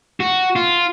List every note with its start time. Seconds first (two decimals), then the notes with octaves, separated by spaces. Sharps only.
0.20 F#4
0.56 F4